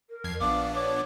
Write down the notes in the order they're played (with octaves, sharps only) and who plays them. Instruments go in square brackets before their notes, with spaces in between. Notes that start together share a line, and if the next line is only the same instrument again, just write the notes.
[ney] A#4
[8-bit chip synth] F2 G#6 C7
[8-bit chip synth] A#1 B3 D4 [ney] F5 [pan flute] D6
[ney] C#5 [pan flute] D6